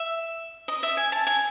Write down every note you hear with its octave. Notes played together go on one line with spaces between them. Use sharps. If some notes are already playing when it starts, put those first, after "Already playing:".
Already playing: E5
D#5
E5
G#5
A5
G#5